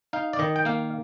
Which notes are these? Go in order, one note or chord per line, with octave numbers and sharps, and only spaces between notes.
D#4 F5
D5
D#3 D#5
G5
A#3 F5